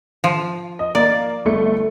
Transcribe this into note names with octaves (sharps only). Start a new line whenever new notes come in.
F3
D#5
A#3 D5
G1 A3 C#7